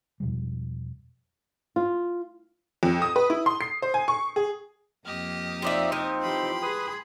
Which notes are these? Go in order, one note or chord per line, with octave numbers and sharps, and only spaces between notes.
E2 B2 F3 G3
F4
F2
D#6
B4
E4
C6
C7
C5
G#5
C#6
G#4
F2 A#3 G4 D#5 F6
C4 D#4 F4 D5 E5
F3
E3 G4 B5 C6
G#4 B4 D#6